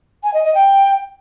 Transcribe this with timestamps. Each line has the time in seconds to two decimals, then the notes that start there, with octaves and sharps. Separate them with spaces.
0.23 G#5
0.34 D#5
0.44 D#5
0.55 G5